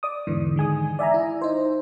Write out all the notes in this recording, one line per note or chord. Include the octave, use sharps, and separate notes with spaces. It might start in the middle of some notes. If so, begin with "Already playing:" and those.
D5 D6 D#6
E2 G#2 D3 E3
D#3 G#3 G#5 D#6
D5 E5 G#5 A#5
E4
D#4 C5